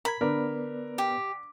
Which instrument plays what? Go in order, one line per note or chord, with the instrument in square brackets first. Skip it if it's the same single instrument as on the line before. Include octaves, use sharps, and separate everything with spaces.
[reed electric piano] A#4 A#5 G#6 [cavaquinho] B5
[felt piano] D3 [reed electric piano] B3 B4 D5 [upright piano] A#4
[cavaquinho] G4